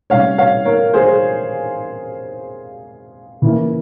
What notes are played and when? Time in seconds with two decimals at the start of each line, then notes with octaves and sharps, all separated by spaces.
0.10 C3 G3 C#4 C#5 F5
0.38 C#5 F5
0.65 A#4 C#5
0.94 G#4 C5
3.42 C#3 E3 A#3 E4